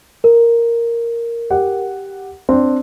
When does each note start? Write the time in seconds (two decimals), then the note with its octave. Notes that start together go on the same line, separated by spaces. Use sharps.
0.24 A#4
1.51 G4 F#5
2.49 C4 D4